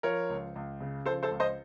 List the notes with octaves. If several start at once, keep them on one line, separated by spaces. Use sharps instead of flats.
F3 A#4 C#5
C#2
C#2
C#3
F3 A4 C5
A4 C5
C#2
C5 D#5